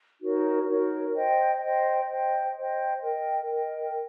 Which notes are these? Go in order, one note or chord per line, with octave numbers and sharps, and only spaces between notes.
D#4 F#4 A#4 C#5
D#4 F#4 A#4 C#5
C5 D#5 G5
C5 D#5 G5
C5 D#5 G5
C5 D#5 G5
A#4 D#5 G5
A#4 D#5 G5